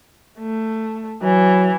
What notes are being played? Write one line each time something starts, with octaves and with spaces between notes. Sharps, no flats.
A3
E3 F#3